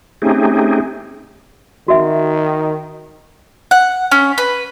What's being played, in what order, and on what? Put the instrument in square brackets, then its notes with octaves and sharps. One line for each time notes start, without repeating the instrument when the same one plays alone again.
[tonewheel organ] A3 C4 C#4 D#4 G4 G#4
[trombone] D#3 [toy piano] F#4 E5 F#5
[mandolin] F#5
C#4
B4